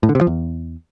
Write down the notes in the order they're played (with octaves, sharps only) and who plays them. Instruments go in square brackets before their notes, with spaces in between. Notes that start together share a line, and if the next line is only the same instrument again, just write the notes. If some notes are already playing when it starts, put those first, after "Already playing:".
[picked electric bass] A2
D3
C3
F3
E2